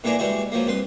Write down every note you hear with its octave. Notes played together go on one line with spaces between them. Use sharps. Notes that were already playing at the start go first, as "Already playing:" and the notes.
A#2 D3 E3 D4 G#4 A#5
E3 G3 G#3 F#4
F3 F#3 A#3
C2 B4 C6